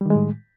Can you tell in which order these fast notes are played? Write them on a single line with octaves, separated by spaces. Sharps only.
G3 D#3 G#3 A2